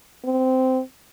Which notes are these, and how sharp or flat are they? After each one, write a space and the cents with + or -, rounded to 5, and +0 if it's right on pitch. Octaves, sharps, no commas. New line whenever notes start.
C4 -15